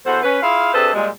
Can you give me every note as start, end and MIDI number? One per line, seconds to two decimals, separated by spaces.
0.06 0.23 40
0.06 0.23 66
0.06 0.23 69
0.06 0.23 72
0.23 0.40 61
0.23 0.40 71
0.43 0.73 64
0.43 0.73 65
0.43 0.73 68
0.43 0.73 77
0.74 0.92 48
0.74 0.92 62
0.74 0.92 68
0.74 0.92 69
0.74 0.92 71
0.74 0.92 72
0.94 1.09 46
0.94 1.09 55
0.94 1.09 56